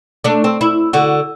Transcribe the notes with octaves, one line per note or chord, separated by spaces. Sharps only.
A3 D4
C4
E4
D3 F#4